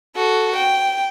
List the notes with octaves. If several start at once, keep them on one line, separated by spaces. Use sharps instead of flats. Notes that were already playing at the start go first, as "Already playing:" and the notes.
F#4 A4
G5